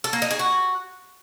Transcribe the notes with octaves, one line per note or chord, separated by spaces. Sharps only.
A4
A#3
D#4
G#4
F#4